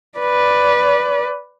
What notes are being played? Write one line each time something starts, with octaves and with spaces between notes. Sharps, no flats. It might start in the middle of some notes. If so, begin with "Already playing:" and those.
B4 D5